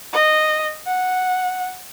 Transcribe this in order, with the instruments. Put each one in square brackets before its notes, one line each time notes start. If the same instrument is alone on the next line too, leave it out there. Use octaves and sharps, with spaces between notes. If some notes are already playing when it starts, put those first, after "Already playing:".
[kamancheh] D#5
F#5